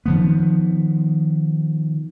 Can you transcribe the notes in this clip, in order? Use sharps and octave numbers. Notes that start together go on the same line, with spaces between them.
D#3 F3 B3